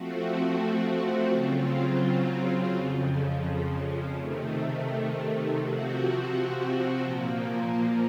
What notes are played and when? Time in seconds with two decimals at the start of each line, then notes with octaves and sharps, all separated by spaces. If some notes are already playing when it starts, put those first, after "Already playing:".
Already playing: F3 A3 C4 F#4
1.30 C#3 F#3 C4 F4
2.72 F2 C#3 F3
4.15 C3 D#3 A3
5.57 C3 F3 C4 F#4
6.99 A#2 F3 A#3